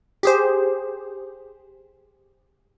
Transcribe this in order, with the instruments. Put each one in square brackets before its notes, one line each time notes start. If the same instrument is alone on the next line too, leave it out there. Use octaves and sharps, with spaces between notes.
[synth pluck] G4 G#4 C5